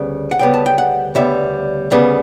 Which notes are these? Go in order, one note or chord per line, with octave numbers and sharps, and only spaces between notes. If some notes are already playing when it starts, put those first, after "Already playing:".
Already playing: D2 C#3 G3 B3
F#5
D2 C#3 G3 B3 G5
A5
G5
F#5
D2 C#3 G3 B3 E5
D2 C#3 G3 B3